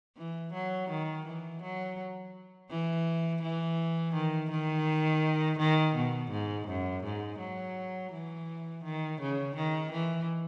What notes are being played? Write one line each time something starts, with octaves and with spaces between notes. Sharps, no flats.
E3
F#3
D#3
E3
F#3
E3
E3
D#3
D#3
D#3
B2
G#2
F#2
G#2
F#3
E3
D#3
C#3
D#3
E3